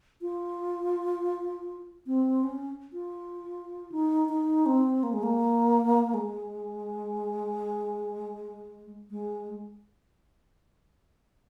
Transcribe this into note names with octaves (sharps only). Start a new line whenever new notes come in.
F4
C4
C#4
F4
D#4
D#4
C4
A#3
G#3
A#3
G#3
G#3